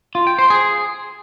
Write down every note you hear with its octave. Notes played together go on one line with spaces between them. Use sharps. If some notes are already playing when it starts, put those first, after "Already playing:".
F4
G5
C5
G#4